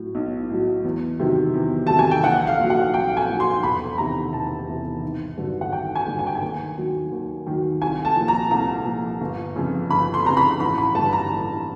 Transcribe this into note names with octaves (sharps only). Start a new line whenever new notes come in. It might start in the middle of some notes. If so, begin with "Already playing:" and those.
Already playing: A2 F#3
B1
A2 F#3
E2
C3 D#3 F#3
E2
C3 D#3 F#3 A5
G#5
G5
A#1 F#5
F5
A#2 F#3
F#5
A#1 G5
G#5
A#2 F#3
C6
E1 B5
E2 C3 D#3 A#5
E1 A5
E2 C3 D#3
G#1
G2 D3 F#3
F#5
G#1 G5
G#5
G2 D3 F#3
G#5
G5
G#5
D#2
D#3 F#3
D#2
D#3 F#3
C2 G#5
A5
A#2 F3
A#5
C2 A#5
A#2 F3
G1
F2 C#3
G1 B5
C6
F2 C#3 A#5
B5
A1 B5
B5
G2 D3 A5
A#5
A1